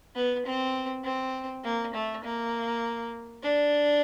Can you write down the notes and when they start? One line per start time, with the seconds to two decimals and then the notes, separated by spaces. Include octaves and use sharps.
0.15 B3
0.46 C4
1.04 C4
1.64 A#3
1.94 A3
2.24 A#3
3.43 D4